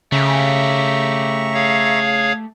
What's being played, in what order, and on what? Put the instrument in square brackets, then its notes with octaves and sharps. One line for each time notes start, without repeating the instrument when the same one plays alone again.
[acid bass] C#3 [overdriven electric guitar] A3 G4 [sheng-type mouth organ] E5 A#5 C#6
[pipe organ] G#4 C#5 F5